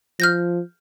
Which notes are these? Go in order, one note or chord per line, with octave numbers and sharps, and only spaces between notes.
F3 F6 G6 A#6